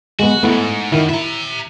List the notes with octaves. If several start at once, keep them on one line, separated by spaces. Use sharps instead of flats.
G#3 B3 F#4
E2 G#2 A3 B3 E4
F#2 D#3 E4
E4 E5 A#5